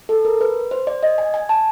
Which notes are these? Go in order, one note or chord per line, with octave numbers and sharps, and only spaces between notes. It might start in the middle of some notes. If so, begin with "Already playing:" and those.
A4
A#4
B4
C5
D5
D#5
G#5
G#5
A5